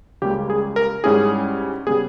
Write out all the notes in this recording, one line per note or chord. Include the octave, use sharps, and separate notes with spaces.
C#2 C#3 G3 A#3 G4
G#4
A#4
G#2 G3 C#4 E4 G#4
C#3 G3 B3 G#4